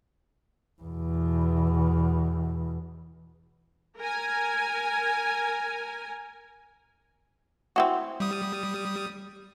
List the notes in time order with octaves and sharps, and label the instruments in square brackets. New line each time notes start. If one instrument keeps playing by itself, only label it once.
[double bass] E2 B2
[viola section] A#4 G#5
[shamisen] C4 E4 F#4
[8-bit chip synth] G3 D#6